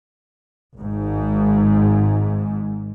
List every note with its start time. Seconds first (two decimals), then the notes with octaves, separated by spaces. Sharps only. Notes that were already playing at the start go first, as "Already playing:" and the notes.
0.77 G#1 G#2